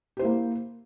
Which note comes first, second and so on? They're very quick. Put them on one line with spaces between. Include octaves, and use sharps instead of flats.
G4 C5 E4 A#3